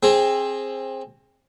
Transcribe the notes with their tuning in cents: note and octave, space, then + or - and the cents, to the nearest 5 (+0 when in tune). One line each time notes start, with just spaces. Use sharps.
C4 +20 G#4 +0